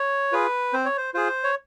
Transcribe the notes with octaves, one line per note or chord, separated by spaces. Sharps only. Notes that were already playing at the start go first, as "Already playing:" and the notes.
Already playing: C#5
F4 G#4 B4
C4 C5
C#5
C5
F4 G#4 C5
C#5